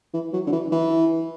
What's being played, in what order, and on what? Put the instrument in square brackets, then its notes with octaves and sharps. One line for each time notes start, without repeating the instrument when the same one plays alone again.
[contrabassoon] E3
F#3
D3
E3
E3